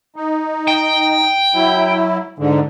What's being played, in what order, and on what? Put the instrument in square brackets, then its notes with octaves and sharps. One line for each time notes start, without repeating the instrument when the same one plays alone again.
[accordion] D#4
[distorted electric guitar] G5
[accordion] F#3 E4
G#2 D3